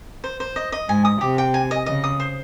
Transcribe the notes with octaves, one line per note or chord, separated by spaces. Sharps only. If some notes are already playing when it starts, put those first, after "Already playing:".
C5
C5
D#5
D#5
G#2 G#5
D#6
C3 G4
G5
G#5
D#5
C#3 D#5
D#6
C5